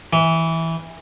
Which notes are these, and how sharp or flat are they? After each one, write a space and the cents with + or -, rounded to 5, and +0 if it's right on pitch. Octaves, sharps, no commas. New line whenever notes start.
E3 -10